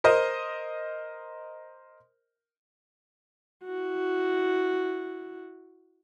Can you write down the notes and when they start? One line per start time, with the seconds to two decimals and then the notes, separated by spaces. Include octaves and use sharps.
0.04 A#4 C5 D#5
3.64 E4 F#4